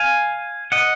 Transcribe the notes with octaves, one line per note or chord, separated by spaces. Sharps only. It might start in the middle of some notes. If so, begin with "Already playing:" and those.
Already playing: F5 G#5
D#5 F#5